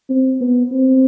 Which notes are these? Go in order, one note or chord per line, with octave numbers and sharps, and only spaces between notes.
C4
B3
C4